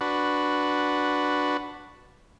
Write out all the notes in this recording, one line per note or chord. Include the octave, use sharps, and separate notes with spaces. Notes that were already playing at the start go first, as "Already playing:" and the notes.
D4 F#4 B4